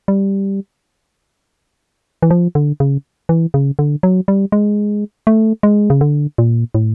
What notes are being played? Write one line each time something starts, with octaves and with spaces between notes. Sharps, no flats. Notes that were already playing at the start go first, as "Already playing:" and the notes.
G3
E3
F3
D3
C#3
E3
C#3
D3
F#3
G3
G#3
A3
G#3
C#3
D3
A#2
A2